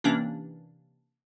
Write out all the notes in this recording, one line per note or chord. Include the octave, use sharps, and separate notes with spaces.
C3 E3 A#3 C#4 D4